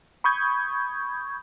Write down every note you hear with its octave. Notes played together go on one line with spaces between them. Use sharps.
B5 C#6 D#6 G6 G#6